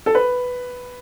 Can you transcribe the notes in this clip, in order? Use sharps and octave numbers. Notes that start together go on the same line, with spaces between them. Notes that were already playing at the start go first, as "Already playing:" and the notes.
A4
B4